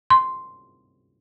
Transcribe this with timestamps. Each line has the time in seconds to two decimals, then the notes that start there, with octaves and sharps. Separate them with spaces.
0.10 C6